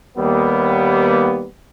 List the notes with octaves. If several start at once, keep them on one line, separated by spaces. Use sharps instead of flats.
D#2 G3 A#3 B3